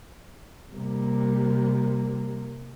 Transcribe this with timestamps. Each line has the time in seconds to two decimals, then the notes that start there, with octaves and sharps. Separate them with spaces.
0.73 C3 G3 A#3